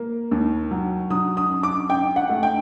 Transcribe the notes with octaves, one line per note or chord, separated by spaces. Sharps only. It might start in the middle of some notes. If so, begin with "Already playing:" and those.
Already playing: A#3
D#2
F#3
F#3 D#6
D#6
F#2
D6
F#2 G5
F#5
A3
G5